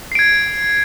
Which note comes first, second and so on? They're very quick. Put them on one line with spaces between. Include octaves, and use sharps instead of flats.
C7 D7 G#6